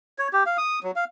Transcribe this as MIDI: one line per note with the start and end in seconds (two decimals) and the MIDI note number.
0.19 0.28 73
0.33 0.43 67
0.46 0.57 77
0.58 0.79 87
0.83 0.91 54
0.96 1.04 77